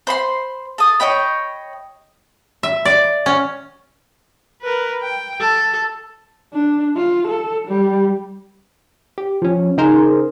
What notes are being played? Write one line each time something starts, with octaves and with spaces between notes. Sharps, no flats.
C5 B5 C6
A4 D#6
C#5 D#5 G5 B5
E5
D5
C#4
A#4 B4
G5
A4
D4
F4
A4
G3
G4
F3 C#4
C#3 D#4 G#4 A#4 C5